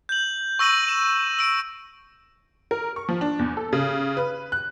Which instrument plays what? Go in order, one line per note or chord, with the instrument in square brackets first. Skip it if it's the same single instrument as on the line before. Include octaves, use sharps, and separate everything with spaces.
[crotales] G6 F#7
C#6 E6 A#6 D#7 F#7
E7
E6 D7
[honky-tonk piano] A#4
C#6
F3
D4
E2
A4
C#3
B4
F#6